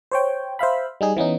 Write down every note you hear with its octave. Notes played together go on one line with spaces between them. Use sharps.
C5 C#5 G5
C5 E5 F5 B5
G3 D#4 G#4
E3 B3 C#4 D#4